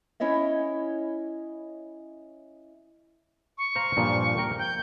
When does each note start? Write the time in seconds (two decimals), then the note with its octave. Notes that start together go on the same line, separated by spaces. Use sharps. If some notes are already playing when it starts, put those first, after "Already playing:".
0.20 C#4 E4 C#5 D#5 E5
3.58 C#6
3.75 C5 F5 A#5
3.97 G2 A#2 F3
4.38 A#4 G5
4.59 G5 G6